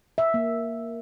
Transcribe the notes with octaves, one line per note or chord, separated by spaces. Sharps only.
E5
A#3